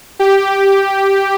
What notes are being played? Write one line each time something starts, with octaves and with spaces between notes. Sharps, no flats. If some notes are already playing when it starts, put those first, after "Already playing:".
G4